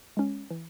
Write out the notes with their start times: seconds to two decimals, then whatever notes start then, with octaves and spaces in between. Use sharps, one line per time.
0.17 G#3 C#4
0.51 E3